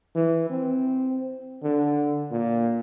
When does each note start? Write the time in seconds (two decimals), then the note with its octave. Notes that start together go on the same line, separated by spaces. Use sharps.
0.15 E3
0.50 C4
1.63 D3
2.31 A#2